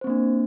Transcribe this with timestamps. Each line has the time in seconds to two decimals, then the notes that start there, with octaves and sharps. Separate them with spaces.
0.01 C5
0.04 C4
0.07 A#3
0.10 D4